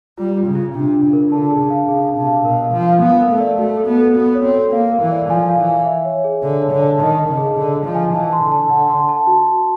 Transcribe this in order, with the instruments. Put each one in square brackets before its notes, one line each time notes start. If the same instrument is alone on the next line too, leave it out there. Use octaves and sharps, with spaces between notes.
[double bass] G3 [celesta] F4
[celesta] F4
[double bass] C#3
[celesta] F4
[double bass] C3 [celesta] D4
[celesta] D4
[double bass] C#3
[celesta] A#4
[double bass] D3 [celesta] A5
[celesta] G#4
[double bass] C#3
[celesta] F5
[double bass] C#3 [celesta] G#4
[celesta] A5
[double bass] C3
[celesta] F5
[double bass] B2 [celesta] A#4
[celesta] F5
[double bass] F3
[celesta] F5
[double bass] B3 [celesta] F5
[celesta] A#4
[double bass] A3
[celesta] D5
[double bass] A3 [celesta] F#4
[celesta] A4
[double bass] B3
[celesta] A4
[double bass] B3 [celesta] F#4
[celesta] C#5
[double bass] C4
[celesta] A4
[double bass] A#3 [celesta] F5
[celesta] A#4
[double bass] E3
[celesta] D5
[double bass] F3 [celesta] G#5
[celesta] F5
[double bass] E3
[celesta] G#5
E5
C#5
G#4
[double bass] D3 [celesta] C#5
[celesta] C#5
[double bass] D3
[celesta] A5
[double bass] D#3 [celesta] D#5
[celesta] D#5
[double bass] C#3
[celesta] G#4
[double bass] D3 [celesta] G#4
[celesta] D#5
[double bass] F3
[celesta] G#5
[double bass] E3 [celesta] A5
[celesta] C6
[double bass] D3
[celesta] A5
[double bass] D3 [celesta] F#5
[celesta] C6
A5
F#4
F#4